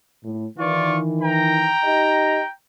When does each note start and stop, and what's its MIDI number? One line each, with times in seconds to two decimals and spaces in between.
0.24 0.46 45
0.58 1.72 51
0.58 1.72 52
0.58 0.98 65
0.58 0.98 74
0.58 0.98 85
1.21 2.49 79
1.21 2.49 82
1.84 2.40 63
1.84 2.40 67
1.84 2.40 75